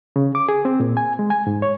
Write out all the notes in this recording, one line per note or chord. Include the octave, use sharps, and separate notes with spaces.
C#3
D6
G#4
C4
A#2
G#5
G#3
G#5
G#2
C#5